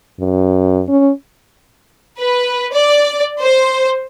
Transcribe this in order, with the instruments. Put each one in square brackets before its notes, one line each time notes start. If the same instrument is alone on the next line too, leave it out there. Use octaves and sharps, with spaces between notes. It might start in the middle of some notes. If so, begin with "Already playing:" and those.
[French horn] F#2
C#4
[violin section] B4
D5
C5